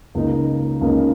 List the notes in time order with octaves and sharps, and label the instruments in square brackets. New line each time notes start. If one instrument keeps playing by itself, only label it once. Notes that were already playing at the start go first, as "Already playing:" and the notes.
[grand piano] C#2 C#3 A#3 D#4
C#2 C#3 A#3 D#4